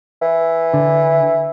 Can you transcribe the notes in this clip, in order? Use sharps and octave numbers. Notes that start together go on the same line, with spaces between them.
E3
D3